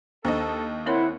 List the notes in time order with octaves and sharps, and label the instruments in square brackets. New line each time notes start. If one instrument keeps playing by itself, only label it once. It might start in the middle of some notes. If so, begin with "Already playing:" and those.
[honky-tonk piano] D#2 D#5 [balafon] D4 C5 [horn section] A4
[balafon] C4 A#4 C#5 [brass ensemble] E4 [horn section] C5 F#5